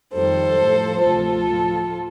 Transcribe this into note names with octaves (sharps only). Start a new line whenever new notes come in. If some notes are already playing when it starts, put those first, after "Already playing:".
F2 D#3 G3 A4 C5
A2 F3
D2 C3 F3 F4 A4
A2 F3